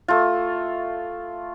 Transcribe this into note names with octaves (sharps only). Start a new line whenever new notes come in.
A3 F4